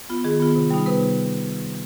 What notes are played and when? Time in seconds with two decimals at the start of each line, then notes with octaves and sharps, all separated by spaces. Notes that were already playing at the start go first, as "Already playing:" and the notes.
0.09 B3 F4
0.24 D#3 G#4
0.40 B3 F4
0.56 C3
0.70 G3 B3 D#4
0.86 C3 B4